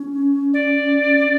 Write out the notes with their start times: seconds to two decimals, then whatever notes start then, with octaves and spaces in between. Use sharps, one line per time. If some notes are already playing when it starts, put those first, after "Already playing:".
Already playing: C#4
0.53 D5
1.18 C#4